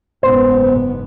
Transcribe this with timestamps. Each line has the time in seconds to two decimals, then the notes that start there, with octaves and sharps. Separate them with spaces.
0.23 F#1 G#2 B3 C5